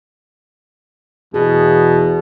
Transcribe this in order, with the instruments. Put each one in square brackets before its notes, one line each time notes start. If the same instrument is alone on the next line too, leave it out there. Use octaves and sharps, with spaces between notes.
[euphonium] E2 [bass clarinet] B2 [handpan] G#4